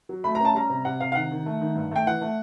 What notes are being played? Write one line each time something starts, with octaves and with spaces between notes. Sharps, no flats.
F#3
A3 B5
A#5
C#4 A5
G3 A#5
C3
C3 F#5
C3 F5
F5
D#3 F#5
D#3
A3
D#3
G2
A3 G5
E3 F#5
A3